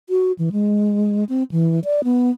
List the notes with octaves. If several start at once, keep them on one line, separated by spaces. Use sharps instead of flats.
F#4
E3
G#3
C4
E3
D5
B3